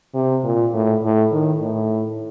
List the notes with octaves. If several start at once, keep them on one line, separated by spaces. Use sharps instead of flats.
C3
A#2
A2
A2
D#3
A2